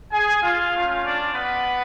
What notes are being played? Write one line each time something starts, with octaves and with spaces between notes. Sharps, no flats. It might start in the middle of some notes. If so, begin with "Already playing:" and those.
G#4 G#5
F4 F5
A3 C#4 F4
D4 D5
B3 B4